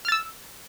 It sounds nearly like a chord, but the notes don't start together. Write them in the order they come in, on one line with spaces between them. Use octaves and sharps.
F6 A6 E6